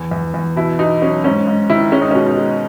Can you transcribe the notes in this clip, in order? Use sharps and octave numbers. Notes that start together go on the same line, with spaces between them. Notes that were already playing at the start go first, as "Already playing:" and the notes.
Already playing: E2
E2
E2
B2 E4
B2 D#4
F#3 C#4
G#2 C#4
G#2
D#3 E4
G#3 C#4
D#4
B2 C#4
D#4
G#3